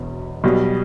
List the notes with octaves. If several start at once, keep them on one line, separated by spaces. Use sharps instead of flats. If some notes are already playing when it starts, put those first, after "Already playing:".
Already playing: E1 E2 B2
B1 B2 G3